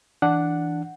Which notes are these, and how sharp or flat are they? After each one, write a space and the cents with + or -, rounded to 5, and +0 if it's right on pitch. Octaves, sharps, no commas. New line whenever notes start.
E3 +0 D4 +0 F#5 +0